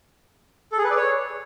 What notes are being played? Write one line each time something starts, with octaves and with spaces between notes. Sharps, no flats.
A4
G#4
B4
D5
C#5